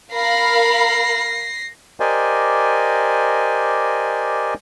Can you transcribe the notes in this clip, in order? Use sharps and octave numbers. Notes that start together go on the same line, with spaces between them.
A#4 F5 B5 A#6 C7
G4 A#4 C5 D5 D#5 G#5